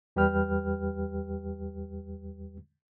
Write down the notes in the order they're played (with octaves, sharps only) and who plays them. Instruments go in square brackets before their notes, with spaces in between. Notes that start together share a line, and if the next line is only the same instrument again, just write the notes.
[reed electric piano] E2 G3 G4 B4 G5 F6